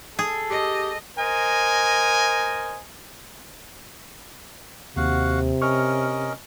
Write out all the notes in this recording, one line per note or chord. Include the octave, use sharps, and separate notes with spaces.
G#4 A4
G4 D#5
A#4 C5 D#5 G#5
D#2 C3 F#4 F5 F#5
C#4 A#4 D#5 C#6 F6